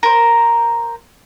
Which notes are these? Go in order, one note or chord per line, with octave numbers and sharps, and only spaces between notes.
A#4 C5